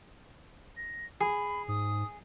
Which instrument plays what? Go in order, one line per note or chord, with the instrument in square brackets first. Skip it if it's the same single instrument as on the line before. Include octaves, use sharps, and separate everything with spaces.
[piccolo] A#6
[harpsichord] G#4 [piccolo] B5
[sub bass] G#2 [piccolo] D#6